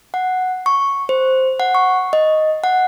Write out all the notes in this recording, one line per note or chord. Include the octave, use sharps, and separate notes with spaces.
F#5
C#6
C5
F#5
C#6
D#5
F#5